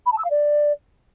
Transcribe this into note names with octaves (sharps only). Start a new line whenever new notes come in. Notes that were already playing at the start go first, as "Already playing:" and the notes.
B5
A5
E6
F5
D5